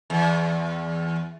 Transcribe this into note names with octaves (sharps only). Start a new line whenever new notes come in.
E2